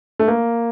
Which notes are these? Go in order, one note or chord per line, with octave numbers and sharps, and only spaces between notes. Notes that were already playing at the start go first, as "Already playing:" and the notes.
A3
A#3